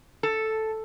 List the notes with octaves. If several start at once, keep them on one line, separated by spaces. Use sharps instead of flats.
A4